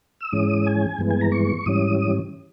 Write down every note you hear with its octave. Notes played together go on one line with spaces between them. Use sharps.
E6
G#2 E3 G#3 C#4 D#6
G#5
G2 E3 G#3 B3
G#5
A#5
C#6
G#2 E3 G3 C#4 D#6
D#6